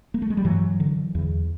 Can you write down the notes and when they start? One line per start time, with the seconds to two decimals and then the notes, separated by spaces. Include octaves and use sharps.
0.14 A#3
0.22 A3
0.30 G#3
0.37 G3
0.44 G2 E3 F#3
0.80 D3
1.15 E2